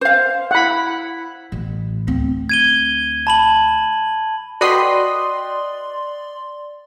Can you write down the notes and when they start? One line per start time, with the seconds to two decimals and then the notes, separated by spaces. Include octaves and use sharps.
0.01 C5 F5
0.51 E4 F#5 B5
1.52 A1
2.07 D2 C4
2.49 G#6 D#7 G7
3.27 A5 B5 F#7
4.61 F#4 B4 D5 D#5 G5 B5 C6 C7